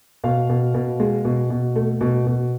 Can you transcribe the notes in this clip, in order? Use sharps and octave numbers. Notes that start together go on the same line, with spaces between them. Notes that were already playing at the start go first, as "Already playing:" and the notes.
B2 F5
B2
B2
G#3
B2
B2
A3
B2
B2